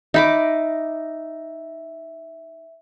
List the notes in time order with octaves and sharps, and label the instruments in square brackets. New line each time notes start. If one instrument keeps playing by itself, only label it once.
[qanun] D#4 B5 D6 [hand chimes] E5